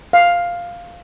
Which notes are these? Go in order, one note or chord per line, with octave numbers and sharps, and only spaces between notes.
F5